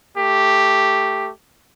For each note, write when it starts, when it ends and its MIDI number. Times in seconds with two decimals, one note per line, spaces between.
0.18 1.29 57
0.18 1.29 67